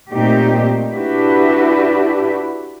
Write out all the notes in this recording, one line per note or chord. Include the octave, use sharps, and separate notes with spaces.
A#2 A3 C4 D#4 G4
D4 E4 F#4 G4 B4